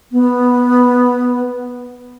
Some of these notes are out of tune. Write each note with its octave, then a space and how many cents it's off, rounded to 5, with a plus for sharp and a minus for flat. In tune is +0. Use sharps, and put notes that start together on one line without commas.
B3 -5